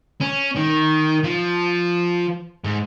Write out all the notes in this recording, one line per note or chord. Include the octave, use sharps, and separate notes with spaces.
C#4
D#3
F3
G#2